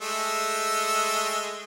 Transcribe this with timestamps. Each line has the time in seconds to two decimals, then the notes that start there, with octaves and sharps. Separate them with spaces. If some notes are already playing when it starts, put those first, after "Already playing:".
0.01 G#3 A3 E6